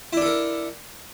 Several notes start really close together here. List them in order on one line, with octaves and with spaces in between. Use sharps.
E4 D4 A4 A#4